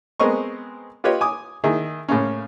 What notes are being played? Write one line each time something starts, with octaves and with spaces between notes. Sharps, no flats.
G#3 B3 C4 A#4 D#5 C#6
F4 G4 B4 C#5 D#5
G#5 D6 D#6
D#3 E4 G#4
A2 C#3 A#3 C#4